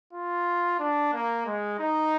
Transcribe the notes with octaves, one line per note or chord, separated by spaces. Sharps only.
F4
D4
A#3
G#3
D#4